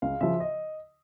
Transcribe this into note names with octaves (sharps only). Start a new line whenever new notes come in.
C#2 F5
C#3 F3 E5
D#5